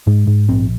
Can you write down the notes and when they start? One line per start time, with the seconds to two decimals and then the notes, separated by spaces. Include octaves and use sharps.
0.07 G#2 G#3
0.27 G#2
0.48 A#1 C4